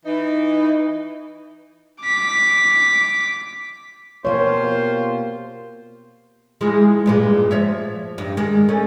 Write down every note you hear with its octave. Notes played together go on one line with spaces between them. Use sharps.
E3 D#4
D6 B6
B2 A#3 F4 G4 C5 C#5
E3 F3 G#3
G2 A#2 G#3
F3 C#5 E5
G2
D#3 G#3
A3 C#4